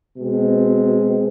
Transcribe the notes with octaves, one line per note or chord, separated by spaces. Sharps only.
B2 G#3 C4